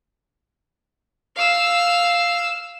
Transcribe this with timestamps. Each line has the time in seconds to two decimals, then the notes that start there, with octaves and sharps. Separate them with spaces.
1.36 F5 E6